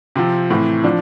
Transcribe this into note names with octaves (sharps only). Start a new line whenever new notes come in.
C3 F3 C4
A2 E3
F3 D4